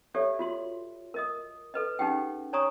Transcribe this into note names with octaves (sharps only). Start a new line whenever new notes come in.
G4 A4 C#5 D5 E5 F5
F4 F#4 C6
A#4 D#5 D#6
A4 B4 D#5
C#4 D#4 G4 G#4 F#5 G5
C#5 D5 G#5 A#5 C#6 D#6